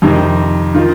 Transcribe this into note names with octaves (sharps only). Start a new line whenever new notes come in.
F2 C3 D#3
D#3 F4